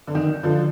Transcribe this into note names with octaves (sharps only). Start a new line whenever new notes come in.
D3
D#3
D3 F3